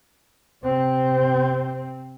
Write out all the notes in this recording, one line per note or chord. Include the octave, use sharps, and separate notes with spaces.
C3 C4